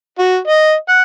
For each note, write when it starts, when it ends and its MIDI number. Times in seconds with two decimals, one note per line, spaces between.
0.19 0.37 66
0.47 0.74 75
0.89 1.03 78